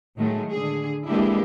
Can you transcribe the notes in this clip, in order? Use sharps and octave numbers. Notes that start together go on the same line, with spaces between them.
A2 D#3 F#3 G#3 A3
D3 G#4
E3 G#3 A#3 D4 E4 G4